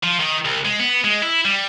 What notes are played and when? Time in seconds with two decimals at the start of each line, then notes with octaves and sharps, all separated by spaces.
0.03 F3
0.20 D#3
0.45 C2
0.65 G#3
0.79 B3
1.04 G#3
1.22 E4
1.45 G3